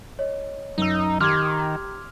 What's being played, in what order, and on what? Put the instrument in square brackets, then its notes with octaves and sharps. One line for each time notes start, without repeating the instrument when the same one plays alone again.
[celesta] C#5 D#5
[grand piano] F#2 E6 [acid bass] D#4
[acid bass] D#3 [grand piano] G4 A#5 F6 [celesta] C6 D6 G#6